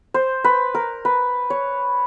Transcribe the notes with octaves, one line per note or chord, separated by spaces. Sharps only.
C5
B4
A#4
B4
C#5